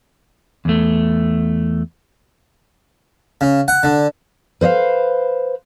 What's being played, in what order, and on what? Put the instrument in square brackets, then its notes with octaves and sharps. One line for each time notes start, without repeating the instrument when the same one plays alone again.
[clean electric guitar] E2 A3
[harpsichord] C#3
F#5
D3
[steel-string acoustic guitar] B4 C5 D#5 F5